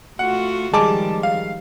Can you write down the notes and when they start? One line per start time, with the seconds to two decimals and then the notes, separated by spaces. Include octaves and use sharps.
0.19 A3 F4 F#4 F#5
0.74 D#3 F3 G3 G#3 A5 D6
1.23 F5